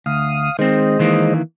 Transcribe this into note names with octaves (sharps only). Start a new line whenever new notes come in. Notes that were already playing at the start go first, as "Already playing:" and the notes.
D2 F5 D#6
D#3 G#3 C4 C5 D#5
D#3 E3 A#3